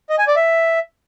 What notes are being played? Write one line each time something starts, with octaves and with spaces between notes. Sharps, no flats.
D#5
G#5
D5
E5